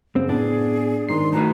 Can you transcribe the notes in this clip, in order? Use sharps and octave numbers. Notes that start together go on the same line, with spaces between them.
F#2 C#3 C4
A2 B3 D4 G#4
G#2 D#3 D#4 C6 C7
A3 F#4 B4 A#5